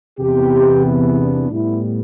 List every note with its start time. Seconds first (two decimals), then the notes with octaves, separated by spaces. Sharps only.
0.19 E2 C3 E3 B3 G4
0.85 E4
1.19 D4
1.51 A2 G3 B3 E4